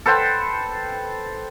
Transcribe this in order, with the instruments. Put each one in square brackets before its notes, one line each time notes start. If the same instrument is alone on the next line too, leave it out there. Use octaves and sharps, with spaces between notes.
[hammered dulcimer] A4 B4 C5 G5